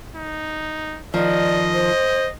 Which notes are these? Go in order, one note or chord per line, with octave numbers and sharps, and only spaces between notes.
D#4
D#3 F3 D5 D#5
C5